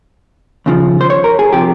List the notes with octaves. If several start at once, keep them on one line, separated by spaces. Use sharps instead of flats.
D#2 C#3 F3
C5
C#5
A#4
G#4
C3 F3 G4